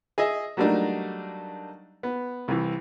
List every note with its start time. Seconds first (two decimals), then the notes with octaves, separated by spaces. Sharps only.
0.18 G#4 D#5 E5
0.57 F#3 G3 A3 A#3 D4 D#4
2.03 B3
2.48 C2 E3